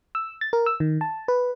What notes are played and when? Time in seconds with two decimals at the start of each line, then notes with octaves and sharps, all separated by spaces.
0.15 E6
0.41 A6
0.53 A#4
0.66 E6
0.80 D#3
1.01 A5
1.28 B4